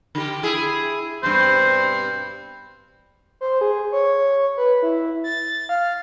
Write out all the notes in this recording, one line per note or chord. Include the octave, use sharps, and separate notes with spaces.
D3 G4
E4 G#4
G2 B2 C4 C5
C5
G#4
C#5
B4
E4
A6
F5